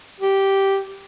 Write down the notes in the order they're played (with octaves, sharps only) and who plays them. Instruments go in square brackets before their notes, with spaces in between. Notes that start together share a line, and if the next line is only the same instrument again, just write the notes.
[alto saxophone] G4